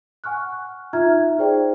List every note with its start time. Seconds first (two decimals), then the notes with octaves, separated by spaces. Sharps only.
0.24 F#5 G#5 C#6 F6 F#6
0.93 D#4 F4 E5 A#5 F6 G#6
1.39 D#4 G#4 C5 D5 G5